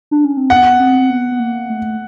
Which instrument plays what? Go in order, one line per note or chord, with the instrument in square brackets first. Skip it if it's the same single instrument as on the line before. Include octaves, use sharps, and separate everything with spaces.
[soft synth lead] D4
C#4
C4
[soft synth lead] B3 [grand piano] F#5
[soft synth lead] C4
B3
B3
A#3
A3